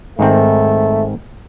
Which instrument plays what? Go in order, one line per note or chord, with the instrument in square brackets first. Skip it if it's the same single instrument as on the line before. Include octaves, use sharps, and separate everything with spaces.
[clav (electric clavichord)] G#2 D#3 C4 [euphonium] A3